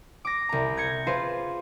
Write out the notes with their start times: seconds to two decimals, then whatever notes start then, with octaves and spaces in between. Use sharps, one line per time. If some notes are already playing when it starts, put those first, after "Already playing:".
0.25 D6 A#6
0.49 C2 A#5
0.77 G6 G#6 A#6 C#7
1.07 F4 G#4 B4 C5